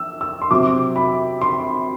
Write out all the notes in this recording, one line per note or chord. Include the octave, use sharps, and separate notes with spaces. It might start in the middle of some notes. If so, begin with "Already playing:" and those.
Already playing: E6
E6
C6
C3 F#3 C4 D6
B5
C6